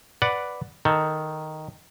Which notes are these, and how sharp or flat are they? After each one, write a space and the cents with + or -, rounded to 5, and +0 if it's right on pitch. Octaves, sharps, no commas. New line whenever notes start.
B4 +0 D5 +0 F#5 +0
D#3 +0 A4 +20